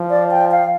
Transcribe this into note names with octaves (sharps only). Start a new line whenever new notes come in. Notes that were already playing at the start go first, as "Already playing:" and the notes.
Already playing: F3
D5
G5
F5